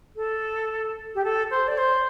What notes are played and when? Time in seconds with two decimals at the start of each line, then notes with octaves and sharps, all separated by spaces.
0.15 A4
1.14 G4
1.23 A4
1.50 C5
1.67 D5
1.77 C5